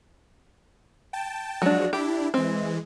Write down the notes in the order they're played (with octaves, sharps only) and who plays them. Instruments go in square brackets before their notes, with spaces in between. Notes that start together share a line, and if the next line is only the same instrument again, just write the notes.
[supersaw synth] G5 A5
[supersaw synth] F3 G#3 F#4 [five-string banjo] F#3 D4
[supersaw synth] D4 E4 [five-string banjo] G4
[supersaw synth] E3 G#3 [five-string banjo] C4